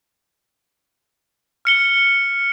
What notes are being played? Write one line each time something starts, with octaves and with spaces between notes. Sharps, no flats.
F6 C#7 G7